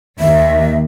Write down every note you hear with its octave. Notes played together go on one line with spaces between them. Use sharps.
D#2 E5